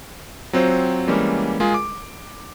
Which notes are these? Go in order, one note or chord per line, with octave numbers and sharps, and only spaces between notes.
F#3 C4 F4 C5
E3 G3 G#3 A#3 C#4
G#3 F4 G#4 A#4
D6